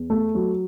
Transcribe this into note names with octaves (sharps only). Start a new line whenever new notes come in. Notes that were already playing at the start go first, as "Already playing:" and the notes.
Already playing: E2
A3
F#3